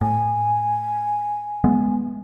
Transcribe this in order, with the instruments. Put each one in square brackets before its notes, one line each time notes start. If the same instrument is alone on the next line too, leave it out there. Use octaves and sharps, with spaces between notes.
[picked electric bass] A2 [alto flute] G#5
[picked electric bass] G#3 A3 B3